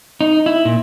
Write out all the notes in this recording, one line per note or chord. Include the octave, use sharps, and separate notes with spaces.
D#4
E4
A#2